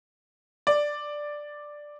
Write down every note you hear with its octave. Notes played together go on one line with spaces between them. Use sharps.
D5